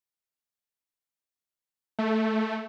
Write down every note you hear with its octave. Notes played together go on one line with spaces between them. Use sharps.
A3